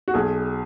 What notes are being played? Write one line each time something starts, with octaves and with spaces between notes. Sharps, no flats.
F#4
B1 G#4